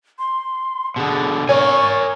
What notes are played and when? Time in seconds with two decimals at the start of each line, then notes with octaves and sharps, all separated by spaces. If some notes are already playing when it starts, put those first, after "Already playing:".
0.19 C6
0.96 B2 D3 G#4
1.49 A#4 C#5 G#5 C#6